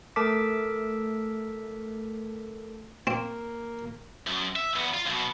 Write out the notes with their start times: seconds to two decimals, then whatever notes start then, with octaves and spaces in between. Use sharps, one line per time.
0.16 A3 A4 A#4 A5 D6 B6
3.07 A#3 C4
4.27 F#2
4.56 E5
4.76 E2 B3
4.94 F4
5.06 B1 B2